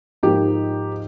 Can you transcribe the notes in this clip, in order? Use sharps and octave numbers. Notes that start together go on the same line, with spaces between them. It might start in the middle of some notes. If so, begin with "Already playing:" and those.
G#2 F3 A#3 D#4 G4